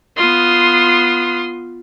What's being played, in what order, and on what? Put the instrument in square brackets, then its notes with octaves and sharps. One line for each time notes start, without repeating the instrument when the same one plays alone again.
[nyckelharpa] B3 F4 [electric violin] C6 D#6